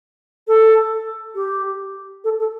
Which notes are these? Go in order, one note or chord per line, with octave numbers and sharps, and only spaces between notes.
A4
G4
A4
A4